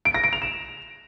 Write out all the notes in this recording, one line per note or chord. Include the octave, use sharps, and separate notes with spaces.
D7
A#6
D7
F7
E7